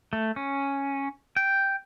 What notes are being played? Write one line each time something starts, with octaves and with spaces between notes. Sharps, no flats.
A3
C#4
G5